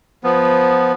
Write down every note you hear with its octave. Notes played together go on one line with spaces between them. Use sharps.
F3 B3